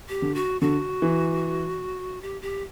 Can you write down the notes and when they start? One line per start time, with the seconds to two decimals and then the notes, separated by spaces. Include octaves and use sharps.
0.09 G4
0.22 D3
0.35 F#4
0.61 D3 F#4
1.02 E3
2.22 G4
2.42 G4